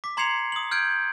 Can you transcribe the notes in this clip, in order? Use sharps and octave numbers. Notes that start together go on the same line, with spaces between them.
D6 B6
A#5 C6 G#6 C7 C#7 F7
D#6 F#7
F6 G6 G#6 D7